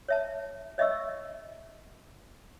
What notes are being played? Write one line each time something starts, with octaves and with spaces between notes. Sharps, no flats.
C#5 E5 A5
C#5 D#5 E5 C#6 E6